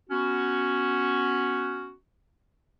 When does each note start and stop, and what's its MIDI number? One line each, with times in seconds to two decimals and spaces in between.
0.10 1.93 59
0.10 1.93 61
0.10 1.93 66